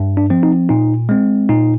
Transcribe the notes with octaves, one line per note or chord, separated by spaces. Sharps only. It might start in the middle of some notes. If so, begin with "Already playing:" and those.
Already playing: G2
D4
F3 C4
D#4
A#2 D#4
G#3 C4
A#2 D#4